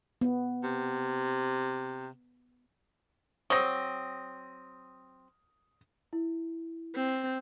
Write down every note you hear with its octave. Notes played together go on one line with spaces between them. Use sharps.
B3
C3
F#3 C4 D#6 A#6
E4
C4